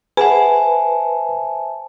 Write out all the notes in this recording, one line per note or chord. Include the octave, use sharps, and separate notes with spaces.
G#4 B4 C5 E5 F#5 G#5 A5